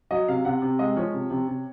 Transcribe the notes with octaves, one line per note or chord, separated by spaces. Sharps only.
F#3 D#5
C3 F5
C3 F#5
C3
G#3 D#5
F3 C#5
C3
C3
C3